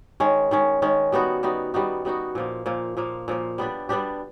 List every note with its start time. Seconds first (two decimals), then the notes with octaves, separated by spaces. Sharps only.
0.20 D#3 G#3 C#4
0.51 D#3 G#3 C#4
0.82 D#3 G#3 C#4
1.12 G3 B3 D#4 F#4
1.43 G3 B3 D#4 F#4
1.74 G3 B3 D#4 F#4
2.05 G3 B3 D#4 F#4
2.35 A#2 F3 A#3
2.66 A#2 F3 A#3
2.97 A#2 F3 A#3
3.28 A#2 F3 A#3
3.58 G3 B3 D4 G4
3.89 G3 B3 D4 G4